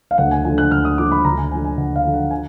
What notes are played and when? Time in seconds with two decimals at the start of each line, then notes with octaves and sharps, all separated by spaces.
0.11 F5
0.18 D2 F#5
0.31 G#5
0.45 D3 F3 G#5
0.58 F#6
0.71 D2 F6
0.85 D#6
0.98 D3 F3 D6
1.12 B5
1.25 D2 A#5
1.38 G#5
1.51 D3 F3 G#5
1.65 G#5
1.77 D2 F#5
1.96 F5
2.05 D3 F3
2.14 F#5
2.31 G#5